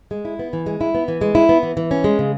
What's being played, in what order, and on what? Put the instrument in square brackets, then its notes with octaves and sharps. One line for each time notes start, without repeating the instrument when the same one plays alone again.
[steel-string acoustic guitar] G#3
E4
B3
E3
G#3
E4
B3
E3
G#3
E4
B3
E3
E3
C#4
G#3
C#3